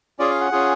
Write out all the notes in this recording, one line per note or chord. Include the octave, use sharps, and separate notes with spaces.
C#4 F4 G#4 D5
F5
F#5
C#4 F4 G#4